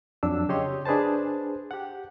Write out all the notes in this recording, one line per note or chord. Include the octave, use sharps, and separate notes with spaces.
F2 F#3 D4 E6
C#3 G4 C#5 D#5 C6
D4 G#4 B4 C5 A5
G4 F#5